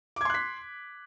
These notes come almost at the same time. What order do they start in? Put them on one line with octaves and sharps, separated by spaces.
D6 G#6 C6 F#6 B6